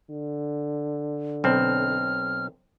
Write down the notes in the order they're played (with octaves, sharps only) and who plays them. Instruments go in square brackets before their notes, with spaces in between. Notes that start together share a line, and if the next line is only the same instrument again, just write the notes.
[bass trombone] D3
[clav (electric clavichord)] B1 C4 [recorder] F6